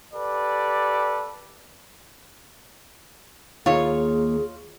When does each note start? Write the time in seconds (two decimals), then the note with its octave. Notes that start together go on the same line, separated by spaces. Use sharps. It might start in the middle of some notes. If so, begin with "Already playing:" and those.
0.13 G4 A4 B4 D5
3.66 D#2 A#3 F4 G#4 C#5